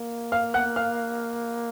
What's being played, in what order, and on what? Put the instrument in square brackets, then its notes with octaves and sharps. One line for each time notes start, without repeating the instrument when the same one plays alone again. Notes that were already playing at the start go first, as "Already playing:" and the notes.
Already playing: [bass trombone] A#3
[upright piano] F5 F6
F#5 F#6
F5 F6